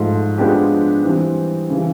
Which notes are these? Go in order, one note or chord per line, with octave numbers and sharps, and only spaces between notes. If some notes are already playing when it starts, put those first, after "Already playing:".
Already playing: G#2 F3 A3
F3 G#3 B3 D4 G4
E3 G3 C4
C#3 E3 G3